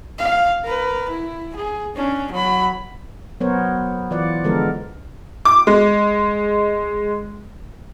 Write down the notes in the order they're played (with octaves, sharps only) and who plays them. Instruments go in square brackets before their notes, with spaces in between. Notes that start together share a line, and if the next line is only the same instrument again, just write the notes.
[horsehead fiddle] F5
A#4 B4
E4
G#4
C#4 D4
F#3 B5
[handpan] F#3 B3 A#4 C5 C#5
E3 F4 D5 F#5
D3 F3 G#3 B3 A4 A#4
[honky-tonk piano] D6
G#3